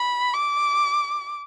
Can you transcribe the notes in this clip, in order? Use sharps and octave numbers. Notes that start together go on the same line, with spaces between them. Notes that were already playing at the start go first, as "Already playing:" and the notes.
Already playing: B5
D6